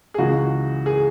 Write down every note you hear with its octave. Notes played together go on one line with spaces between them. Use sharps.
G#4
C#2 C#3 E3 F#4
G#4